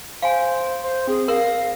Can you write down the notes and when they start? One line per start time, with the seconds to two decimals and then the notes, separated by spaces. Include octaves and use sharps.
0.22 C5 F5 G#5
0.83 C5
1.08 C4 G#4
1.28 A#4 F5 A#6